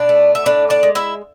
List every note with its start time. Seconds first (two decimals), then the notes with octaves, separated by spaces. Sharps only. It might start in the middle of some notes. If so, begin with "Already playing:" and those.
Already playing: B2 D4 D5
0.09 A3
0.35 E5
0.46 A2 D4 D5
0.70 D4 D5
0.83 G#3
0.95 E4 E5